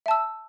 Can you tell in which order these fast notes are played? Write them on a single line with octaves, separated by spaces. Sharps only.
E5 A5 E6